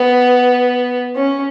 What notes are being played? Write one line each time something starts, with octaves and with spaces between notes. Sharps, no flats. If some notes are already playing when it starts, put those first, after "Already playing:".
Already playing: B3
C#4